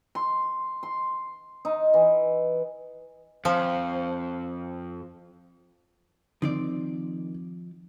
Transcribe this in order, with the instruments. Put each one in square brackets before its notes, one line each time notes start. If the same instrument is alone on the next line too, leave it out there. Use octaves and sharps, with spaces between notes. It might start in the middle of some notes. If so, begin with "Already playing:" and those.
[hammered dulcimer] C6
C6
D#4
E3
[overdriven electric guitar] F2 [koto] F3
[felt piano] D#3 [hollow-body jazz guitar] F3 C4 D5